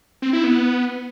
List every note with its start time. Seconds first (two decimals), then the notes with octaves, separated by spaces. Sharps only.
0.22 C4
0.33 E4
0.44 B3